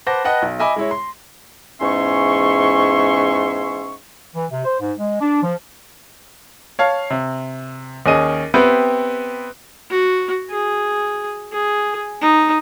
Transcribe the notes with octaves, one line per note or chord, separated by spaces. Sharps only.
B4 C5 F#5 A5 D6 A#6
B4 D#5 F#5 G5 A5
B1
D#5 E5 G#5 B5 D6
G#3 E4 C#5
C6
E2 G#2 C#4 E5 C6 C#6
E3
C3
C5
G#2
G#3
D4
F3
C#5 F5 A5
C3
D#2 C#4 G#4 D#5 D#7
B3 C4 G4 B4 E5
F#4
G#4
G#4
D#4